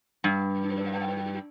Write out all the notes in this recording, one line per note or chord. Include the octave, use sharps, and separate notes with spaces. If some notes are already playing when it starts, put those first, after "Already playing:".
G2